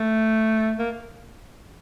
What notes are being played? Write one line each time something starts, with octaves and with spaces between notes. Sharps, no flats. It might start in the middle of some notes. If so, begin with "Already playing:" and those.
Already playing: A3
A#3